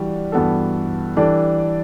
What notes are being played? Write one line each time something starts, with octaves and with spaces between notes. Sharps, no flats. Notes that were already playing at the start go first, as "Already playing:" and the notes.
Already playing: E3 G3 D4 F#4
G2 E3 B3 F#4 A4
E3 G3 D4 A4 D5